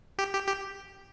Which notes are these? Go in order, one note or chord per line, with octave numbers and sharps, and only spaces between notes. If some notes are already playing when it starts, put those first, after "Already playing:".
G4
G4
G4